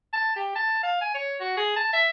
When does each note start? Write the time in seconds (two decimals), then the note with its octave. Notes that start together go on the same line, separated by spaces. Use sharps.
0.13 A5
0.36 G4
0.55 A5
0.83 F5
1.01 G#5
1.14 C#5
1.40 F#4
1.57 G#4
1.76 A5
1.93 E5